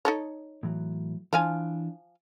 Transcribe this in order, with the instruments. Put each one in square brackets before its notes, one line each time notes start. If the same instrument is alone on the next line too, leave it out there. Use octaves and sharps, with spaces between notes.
[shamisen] D#4 A4 C#5
[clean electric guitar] A2 E3 F#3
[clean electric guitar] E3 D4 [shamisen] F3 F5 G#5